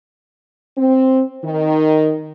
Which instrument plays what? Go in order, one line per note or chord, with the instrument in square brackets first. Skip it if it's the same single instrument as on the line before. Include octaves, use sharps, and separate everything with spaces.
[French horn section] C4
D#3